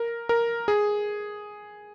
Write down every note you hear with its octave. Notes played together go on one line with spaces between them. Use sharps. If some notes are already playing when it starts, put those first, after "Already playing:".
Already playing: A#4
A#4
G#4